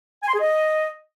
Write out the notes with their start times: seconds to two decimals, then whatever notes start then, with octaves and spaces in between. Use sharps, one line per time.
0.23 G#5
0.29 C6
0.34 G#4
0.40 D#5